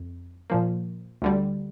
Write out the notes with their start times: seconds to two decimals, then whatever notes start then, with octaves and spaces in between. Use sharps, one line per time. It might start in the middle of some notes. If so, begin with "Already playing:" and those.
Already playing: F2
0.50 A#2 F3 A#3
1.22 D2 D3 G3